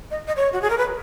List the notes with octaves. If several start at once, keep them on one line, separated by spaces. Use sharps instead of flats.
D#5
D#5
C#5
F#4
G#4
A#4
B4